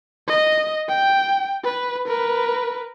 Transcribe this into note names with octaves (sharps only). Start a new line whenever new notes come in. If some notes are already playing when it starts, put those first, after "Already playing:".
D#5
G5
B4
A#4 B4